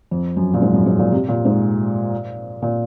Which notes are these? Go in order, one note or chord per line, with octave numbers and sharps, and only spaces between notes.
F2
F#2
A#2
G#2
F#2
G#2
A#2
C3
A#2
G#2
A#2